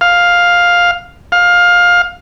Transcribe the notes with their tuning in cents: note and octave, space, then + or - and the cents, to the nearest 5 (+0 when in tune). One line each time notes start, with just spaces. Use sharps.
F5 +10
F5 +20